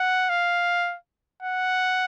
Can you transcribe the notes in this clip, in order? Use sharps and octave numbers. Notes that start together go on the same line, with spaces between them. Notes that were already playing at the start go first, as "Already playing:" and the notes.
Already playing: F#5
F5
F#5